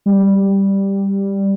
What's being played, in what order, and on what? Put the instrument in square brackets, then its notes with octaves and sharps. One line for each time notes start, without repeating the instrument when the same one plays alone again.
[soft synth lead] G3